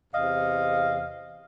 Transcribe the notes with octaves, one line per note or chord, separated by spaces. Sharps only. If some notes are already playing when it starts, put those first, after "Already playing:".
E2 C3 D#5 F5